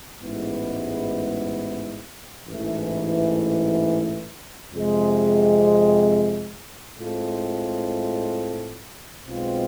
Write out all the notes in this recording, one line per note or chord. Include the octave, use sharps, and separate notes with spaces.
A1 G#2 G#3 B3 E4
A1 G#2 E3 A3
F2 C3 G#3
A2 G#3 C4 F4 A4
B1 B2 G#3 C4 F4